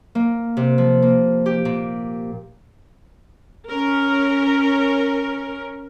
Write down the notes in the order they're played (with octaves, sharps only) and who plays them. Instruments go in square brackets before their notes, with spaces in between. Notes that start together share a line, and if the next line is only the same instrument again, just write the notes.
[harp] A#3
C3
F3
A#3
G4
A#2
[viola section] C#4 A#4